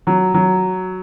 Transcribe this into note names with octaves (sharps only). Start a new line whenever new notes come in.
F#3
F#3